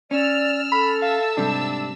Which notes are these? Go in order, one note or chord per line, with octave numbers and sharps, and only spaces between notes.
C#4 D5 E6 F6
A4 B5
E5 F5 A5 E6
G#2 C3 G3 D4